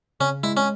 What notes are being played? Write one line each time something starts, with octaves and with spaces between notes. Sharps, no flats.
C#3 C#4
G#3 E4
C#4